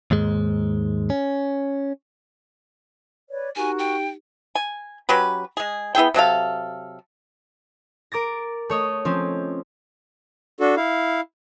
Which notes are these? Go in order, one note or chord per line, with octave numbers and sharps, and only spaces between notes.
D#2 G#2 G#3
C#4
B4 C#5 D5
D#4 F#4 G4 A#4 G#5
G5
G#5
F#3 C#4 G4 B4
G#3 G#4
B3 E4 G#4 G5
C3 F#3 A4 F5
A#4 D6 A6 A#6
A3 C#5 D#5
F3 C4 C#4
D4 F#4 A4
E4 F5